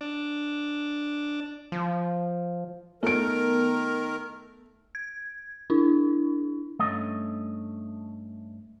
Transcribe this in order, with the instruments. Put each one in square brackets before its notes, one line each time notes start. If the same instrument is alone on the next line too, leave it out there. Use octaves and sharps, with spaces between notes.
[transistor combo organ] D4
[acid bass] F3
[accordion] D#3 A#4 [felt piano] A3 D7 [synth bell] B3
[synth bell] G#6
D4 E4
[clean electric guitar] G2 A3 C#4 D#5